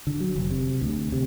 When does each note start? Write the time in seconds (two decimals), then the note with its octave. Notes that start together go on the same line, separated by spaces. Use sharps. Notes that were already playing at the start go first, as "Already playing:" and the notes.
0.07 D3
0.20 F#3
0.36 F1
0.51 C3
0.81 D2
1.12 C3